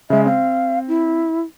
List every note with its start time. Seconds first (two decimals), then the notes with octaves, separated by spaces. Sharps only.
0.10 C#3 G#3 E5
0.26 C4 F5
0.88 E4